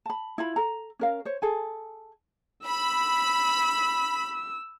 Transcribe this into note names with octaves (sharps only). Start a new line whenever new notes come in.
A5 B5
E4 F4 B5
A4 A#5
C#4 A#4 F5
C5 C#5
G#4 A4 G#5
B5 E6